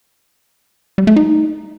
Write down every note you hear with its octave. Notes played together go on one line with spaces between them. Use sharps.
G3
A3
D#4